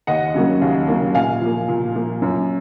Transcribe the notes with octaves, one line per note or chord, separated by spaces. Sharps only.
D#2 D#5 F#5
C#3 F#3 A#3
D#2
C#3 F#3 A#3
A#2 F5 G#5
F3 A#3
A#2
F3 A#3
F#2